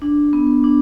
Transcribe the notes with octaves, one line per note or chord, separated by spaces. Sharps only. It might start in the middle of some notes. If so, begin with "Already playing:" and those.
D4
B3
D4